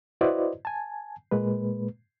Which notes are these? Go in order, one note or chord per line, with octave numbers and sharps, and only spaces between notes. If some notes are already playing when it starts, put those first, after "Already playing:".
E4 F#4 B4 C5 D5 D#5
G#5 A5
A#2 G#3 A#3 B4